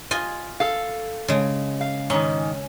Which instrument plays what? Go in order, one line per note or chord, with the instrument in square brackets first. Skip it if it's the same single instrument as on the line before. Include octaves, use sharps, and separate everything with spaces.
[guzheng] F4 D#5 G#5
[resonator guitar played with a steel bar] A4 F5
[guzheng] C#3 G#3
[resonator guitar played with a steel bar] F5
[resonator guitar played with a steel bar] G#2 D#3 [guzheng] C#4